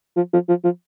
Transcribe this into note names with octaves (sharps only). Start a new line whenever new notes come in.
F3
F3
F3
F3